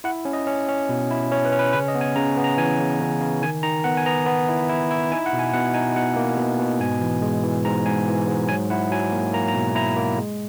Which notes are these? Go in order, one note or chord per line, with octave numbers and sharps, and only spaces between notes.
E4 F#5
C#4
D#5
C#4
C#4
B2
E4
C#4 C#5
B4
C#4
B4
C#3 B4
D#5
B3
G#5
C#3 A#5
B3
A#5
E3 G#5
C#3
C#3
C#3
D#3 G#5
D#3 A#5
B3 F#5
G#5
B3 A#5
B3
E4
E4
E4
D#4 G#5
F#5
B2
G#5
B2 F#5
D#4 G#5
B2 F#5
A#3
B2
B2
G#2 G#5
E3
G#3
E3
G#2 A#5
G#2 G#5
E3
G#2
F#3 G#5
E4 F#5
F#3 G#5
A#3
A#3 A#5
A#5
B2
E4 A#5
A#3
G#3